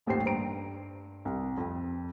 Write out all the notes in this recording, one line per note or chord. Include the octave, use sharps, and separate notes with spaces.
D#1 A1 D#2 G4 C5 C7
G2 C5 A#5 D7
C2
F2